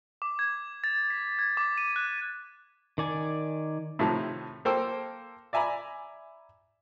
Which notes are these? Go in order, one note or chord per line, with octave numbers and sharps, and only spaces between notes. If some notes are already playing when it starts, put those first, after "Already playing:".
D6
G#6
A6
B6
G#6
D6
D#7
F#6
D#3 D5 G#5
A2 C3 D#3 F3
A#3 A4 C5 G5 E6
D5 E5 G#5 A#5 B5